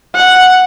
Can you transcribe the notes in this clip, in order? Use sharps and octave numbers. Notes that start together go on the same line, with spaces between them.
F#5